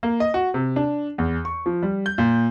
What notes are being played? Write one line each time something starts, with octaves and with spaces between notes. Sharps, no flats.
A#3
D#5
F#4
C3
D4
E2
C#6
F3
G3
G6
A#2